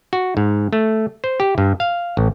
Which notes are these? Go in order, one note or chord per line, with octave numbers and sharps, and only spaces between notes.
F#4
G#2
A3
C5
G4
G2
F5
A1